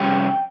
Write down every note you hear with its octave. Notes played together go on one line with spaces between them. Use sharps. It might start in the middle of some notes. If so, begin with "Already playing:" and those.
Already playing: F2 C3 G3 C#4 G5